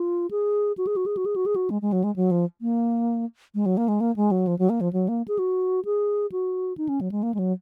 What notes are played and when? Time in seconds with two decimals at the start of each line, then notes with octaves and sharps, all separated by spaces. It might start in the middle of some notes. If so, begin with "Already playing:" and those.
Already playing: F4
0.31 G#4
0.78 F#4
0.87 G#4
0.96 F#4
1.06 G#4
1.17 F#4
1.26 G#4
1.36 F#4
1.46 G#4
1.56 F#4
1.70 G#3
1.82 G#3
1.92 F#3
2.04 G#3
2.16 F#3
2.31 F3
2.61 A#3
3.55 G#3
3.66 F#3
3.77 A#3
3.88 G#3
4.01 A#3
4.16 G#3
4.31 F#3
4.47 F3
4.59 F#3
4.70 A#3
4.81 F3
4.93 F#3
5.08 A#3
5.28 G#4
5.39 F#4
5.85 G#4
6.32 F#4
6.78 D#4
6.89 C#4
7.01 F#3
7.12 G#3
7.23 A#3
7.34 G#3
7.39 F#3